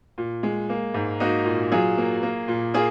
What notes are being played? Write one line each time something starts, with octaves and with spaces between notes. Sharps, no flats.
A#2
G#3
A#3
G#2
A#3 D#4 F#4
A#2
F#3 F4 G#4
A#3
A#3
A#2
A#3 F4 G#4